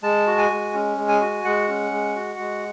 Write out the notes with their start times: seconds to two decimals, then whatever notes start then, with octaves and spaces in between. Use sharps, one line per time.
0.03 G#3 A5
0.27 F#4
0.38 G#5
0.50 G#3
0.74 C#4
0.97 G#3
1.08 G#5
1.21 F#4
1.45 G#3 F#5
1.68 C#4
1.91 G#3
2.15 F#4
2.39 G#3